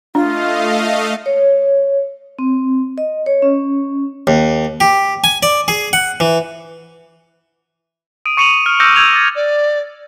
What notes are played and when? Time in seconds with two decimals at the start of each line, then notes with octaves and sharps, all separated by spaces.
0.15 A3 D4 F4 D#5 F5
1.26 C#5
2.39 C4
2.98 D#5
3.26 C#5
3.42 C#4
4.27 D#2
4.80 G4
5.24 G#5
5.43 D5
5.68 G#4
5.93 F#5
6.20 E3
8.25 D#6 D7 D#7
8.37 C#6 C#7 D#7 F7 F#7
8.66 F6
8.80 D6 E6 F6 G6 A#6 C#7
8.96 E6 G6 G#6 F7
9.13 D6 A6
9.35 D5